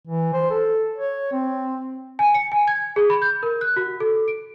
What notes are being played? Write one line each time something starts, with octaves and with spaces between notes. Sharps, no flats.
E3
C5
A4
C#5
C4
G#5
C#7
G#5
G#6
G#4
B5
G6
A#4
F#6
F#4
A4
D7